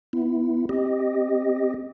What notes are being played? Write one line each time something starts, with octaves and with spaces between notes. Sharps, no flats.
B3 E4
C4 G4 D#5